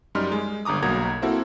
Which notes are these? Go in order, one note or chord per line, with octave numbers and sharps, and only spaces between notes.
F#2 G3 D#4 C6 F6
G#3
G1 G2 A#5 D6 D#6
B1 A#3 F#4 A#5 D#6 G#6
A#3 C4 E4 F#4 A4